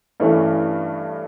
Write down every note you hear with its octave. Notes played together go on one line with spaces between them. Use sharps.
G2 E3 A3 C#4